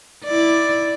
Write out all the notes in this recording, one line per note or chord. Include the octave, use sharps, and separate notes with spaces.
E4 D5